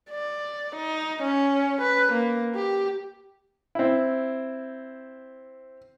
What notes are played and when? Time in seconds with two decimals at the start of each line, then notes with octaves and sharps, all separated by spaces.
0.11 D5
0.76 D#4
1.22 C#4
1.81 B4
2.12 A#3
2.56 G4
3.75 C4 E4